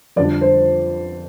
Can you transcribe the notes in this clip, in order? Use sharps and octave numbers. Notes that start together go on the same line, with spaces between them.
F2 D3 G3 D4 D5
C5